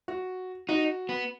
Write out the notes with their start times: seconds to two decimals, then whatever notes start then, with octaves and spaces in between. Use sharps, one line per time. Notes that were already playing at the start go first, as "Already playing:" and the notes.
0.08 F#4
0.69 D#4 F#4
1.09 B3